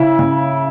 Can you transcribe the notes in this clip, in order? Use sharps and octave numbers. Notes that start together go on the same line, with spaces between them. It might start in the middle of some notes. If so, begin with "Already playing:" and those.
Already playing: C#3 E4
C#3